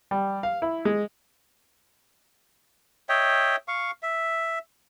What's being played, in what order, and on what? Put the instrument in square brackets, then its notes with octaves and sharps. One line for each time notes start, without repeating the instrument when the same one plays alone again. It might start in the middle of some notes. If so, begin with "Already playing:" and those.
[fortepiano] G3
F5
E4
G#3
[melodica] C#5 D#5 E5 G5
F5 C#6
E5